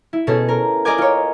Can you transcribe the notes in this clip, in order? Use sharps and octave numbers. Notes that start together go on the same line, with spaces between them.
E4
B2 C#4 G#4 A4
A#4
A#4 D5 D#5 G#5 D6 G#6
F4 C#5